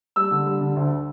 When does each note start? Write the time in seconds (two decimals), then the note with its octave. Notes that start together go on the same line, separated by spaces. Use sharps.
0.16 G3 E6
0.31 D3
0.46 G3
0.61 D3
0.76 D2